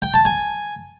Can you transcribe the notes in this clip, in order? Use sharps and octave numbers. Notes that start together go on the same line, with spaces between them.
G5
A5
G#5